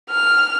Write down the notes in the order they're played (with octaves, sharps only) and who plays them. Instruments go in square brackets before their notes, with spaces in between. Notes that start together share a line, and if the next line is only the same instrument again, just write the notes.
[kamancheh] F6